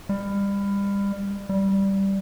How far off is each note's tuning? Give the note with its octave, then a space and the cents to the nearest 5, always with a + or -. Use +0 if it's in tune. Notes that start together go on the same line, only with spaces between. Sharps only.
G3 +30
G3 -5